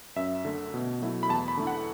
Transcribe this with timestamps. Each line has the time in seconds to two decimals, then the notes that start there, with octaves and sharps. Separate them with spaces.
0.16 F#2 E5
0.45 D3 A3
0.74 B2
1.02 F#3 A3 E4
1.23 B5
1.29 E2 A5
1.48 B5
1.57 D3 A3 E4
1.67 F#5